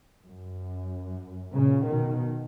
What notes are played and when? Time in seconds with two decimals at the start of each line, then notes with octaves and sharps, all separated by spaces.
0.23 F#2
1.54 A#2 C#3
1.87 B2 D#3